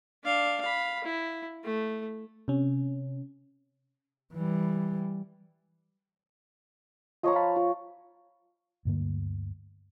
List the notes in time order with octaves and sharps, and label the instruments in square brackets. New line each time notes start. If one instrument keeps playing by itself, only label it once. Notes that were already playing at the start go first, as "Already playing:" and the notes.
[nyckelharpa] D4 F5
F5 B5
E4
A3
[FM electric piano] C3 C#4
[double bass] E3 G3
[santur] F3 C#5 A#5 [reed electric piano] F4 D#5
[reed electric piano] F5 A5 B5
F4
[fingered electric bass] D2 G2 D3 A#3